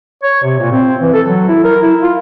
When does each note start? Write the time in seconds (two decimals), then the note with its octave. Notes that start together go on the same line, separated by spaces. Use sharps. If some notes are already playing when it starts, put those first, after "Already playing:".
0.23 C#5
0.43 C3
0.60 A#2
0.72 C4
1.01 E3
1.14 A4
1.27 F#3
1.48 E4
1.64 A#4
1.81 E4
2.02 F4